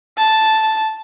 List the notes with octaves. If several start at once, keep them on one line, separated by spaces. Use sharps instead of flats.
A5